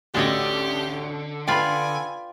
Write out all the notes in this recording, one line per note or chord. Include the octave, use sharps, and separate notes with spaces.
A1 D2 D3 D4 G4 C#5 D#5 D#6
F4 B4 D5 G5 G#5 B5